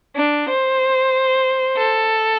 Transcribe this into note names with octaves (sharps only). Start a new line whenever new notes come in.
D4
C5
A4